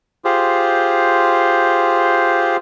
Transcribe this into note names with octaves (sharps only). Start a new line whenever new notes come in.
F4 G4 G#4 C5